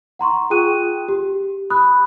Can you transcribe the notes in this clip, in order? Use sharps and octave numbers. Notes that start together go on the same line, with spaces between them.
F#5 A#5 C6 C#6
F4 G#4 G5 D#6 F#6 D#7
G4
B5 D#6 F#6